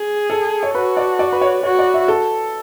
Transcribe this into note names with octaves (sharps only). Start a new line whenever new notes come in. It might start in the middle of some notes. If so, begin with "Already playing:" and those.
Already playing: G#4
A4
C#5
F#4 B4
D5
D5
B4
C#5
F#4 C#5
D5
E5
A4